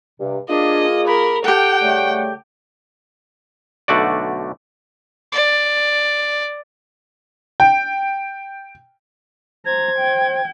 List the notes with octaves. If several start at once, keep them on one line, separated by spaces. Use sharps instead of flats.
G2 C3
A#3 D4 F4 G#4 D#5
A#4 B5
G4 A4 F#5 G5
C#3 G3 A3
B1 D3 A3 F#4 D5
D5
G5
C5 A#5 G#6
G5